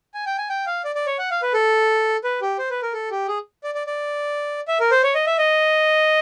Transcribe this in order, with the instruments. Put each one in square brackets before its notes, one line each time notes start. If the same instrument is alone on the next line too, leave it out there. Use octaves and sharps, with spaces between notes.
[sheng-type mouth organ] G#5
G5
G#5
G5
F5
D5
D5
C#5
F#5
F5
B4
A4
B4
G4
C5
B4
A#4
A4
G4
G#4
D5
D5
D5
E5
A#4
C5
C#5
D#5
E5
D#5